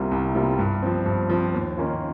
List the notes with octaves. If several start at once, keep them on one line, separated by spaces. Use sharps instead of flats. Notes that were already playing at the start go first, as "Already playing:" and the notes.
Already playing: C2 C3 G3 A#3 F4
C2
C3 G3 A#3 F4
G2
F3 C4
G2
F3 C4
D#2
D#3 A#3 C#4 F4